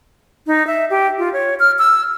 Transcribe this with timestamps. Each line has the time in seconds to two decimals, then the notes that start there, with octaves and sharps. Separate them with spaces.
0.47 D#4
0.67 E5
0.90 G4
1.19 F4
1.33 C#5
1.60 F6
1.79 E6